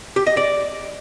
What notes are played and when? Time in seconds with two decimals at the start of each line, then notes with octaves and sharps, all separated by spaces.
0.16 G4
0.27 D#5
0.37 D5